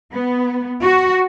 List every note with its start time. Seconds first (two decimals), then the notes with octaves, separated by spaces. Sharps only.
0.12 B3
0.81 F#4